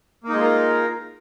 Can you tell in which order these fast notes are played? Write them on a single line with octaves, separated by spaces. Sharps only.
A#3 D#4 G#3 F4 A#4